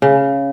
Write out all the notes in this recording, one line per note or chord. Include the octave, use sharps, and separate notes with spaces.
C#3